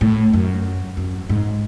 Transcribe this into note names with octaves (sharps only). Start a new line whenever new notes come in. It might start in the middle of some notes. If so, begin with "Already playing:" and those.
A2
F#2
F#2
G#2